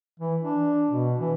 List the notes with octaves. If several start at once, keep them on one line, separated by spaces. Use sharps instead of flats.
E3
D4
B2
E3